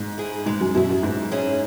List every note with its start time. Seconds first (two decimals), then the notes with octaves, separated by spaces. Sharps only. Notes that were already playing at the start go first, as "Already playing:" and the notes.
Already playing: G#2
0.18 E4 G#4
0.46 G#2 G#3
0.60 F#2
0.75 F#2 B2 E4 G#4
0.89 F#2
1.03 G#2 E3
1.32 C#4 E4 G#4